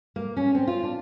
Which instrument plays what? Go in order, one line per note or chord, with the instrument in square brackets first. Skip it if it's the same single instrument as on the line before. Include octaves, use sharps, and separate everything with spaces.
[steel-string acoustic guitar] A#3
C#4
C4
F4
D4